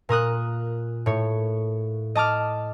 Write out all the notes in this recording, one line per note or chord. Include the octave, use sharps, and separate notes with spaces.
A#2 A#4 D#6 F#6
A2 C#5
D#5 A5 D6 F6